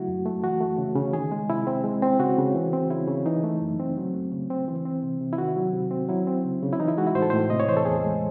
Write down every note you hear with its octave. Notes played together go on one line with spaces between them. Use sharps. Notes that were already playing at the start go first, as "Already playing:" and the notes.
Already playing: C#3 F#3 A3 E4 F#4
F#2
A3
E3 F#4
A3
C#3
C#3
D#3 G#4
G#3
C3 E4
C4
G#3
C4
C#3 F#4
C#3
E3
C4
C#3 E4
C#3
E3 D#4
A3
F#2
C4
F#3
A3
C#3
C4
E3
C4
C3
C3
E4
D#3 F#4
F#3
C3
C4
F#3 E4
C4
C#3
C#3
E4
E3 D#4
E4
G#3 F#4
E4
A2 C5
A4
A2 C5
C3 D#5
C#5
E3 C5
A4
E2 G#4
G#3